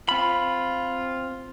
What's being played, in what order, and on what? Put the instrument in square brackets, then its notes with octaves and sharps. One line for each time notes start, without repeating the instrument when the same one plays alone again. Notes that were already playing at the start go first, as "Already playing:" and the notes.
[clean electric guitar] C4 B5 [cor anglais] F4